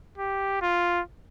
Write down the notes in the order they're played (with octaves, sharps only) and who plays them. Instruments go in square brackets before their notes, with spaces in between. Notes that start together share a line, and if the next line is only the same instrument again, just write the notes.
[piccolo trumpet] G4
F4